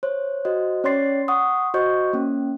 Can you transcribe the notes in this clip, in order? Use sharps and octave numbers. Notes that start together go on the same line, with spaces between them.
C5 C#5
F#4 C5 D#5
C#4 C#5 D5 C6 A6 C7
F#5 C6 C#6 D#6
F#4 C5 D#5 C#6 G6
A#3 C#4